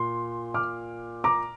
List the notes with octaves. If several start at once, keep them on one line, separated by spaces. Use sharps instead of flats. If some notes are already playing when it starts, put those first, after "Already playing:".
Already playing: A#2 C6
D6 F6
A#5 D6